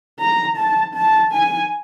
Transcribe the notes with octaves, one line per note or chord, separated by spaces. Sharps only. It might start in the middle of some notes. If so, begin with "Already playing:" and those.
A#5
A5
A5
G#5